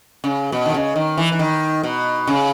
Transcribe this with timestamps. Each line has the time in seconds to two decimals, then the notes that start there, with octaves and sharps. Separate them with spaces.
0.24 C#3
0.52 B2
0.66 D#3
0.74 C#3
0.96 D#3
1.18 E3
1.32 E3
1.39 D#3
1.83 B2
2.27 C#3